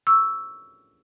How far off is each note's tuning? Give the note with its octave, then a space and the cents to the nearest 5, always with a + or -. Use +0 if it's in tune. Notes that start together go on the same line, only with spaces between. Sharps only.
C#6 +25 E6 +0